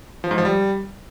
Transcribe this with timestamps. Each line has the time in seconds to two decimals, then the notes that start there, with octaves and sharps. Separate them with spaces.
0.24 F3
0.31 G#2
0.38 F3
0.45 G3